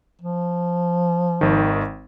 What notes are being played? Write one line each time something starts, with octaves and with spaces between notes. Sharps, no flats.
F3
G#1 D#3